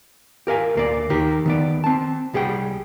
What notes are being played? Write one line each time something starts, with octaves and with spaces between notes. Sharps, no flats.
G4 A#4 F5 G#5
D2 A#3 D5
D#2 D#3 G4 A#4
D#3 B3 D5
C4 A5
C2 G3 G#4 F#5 G5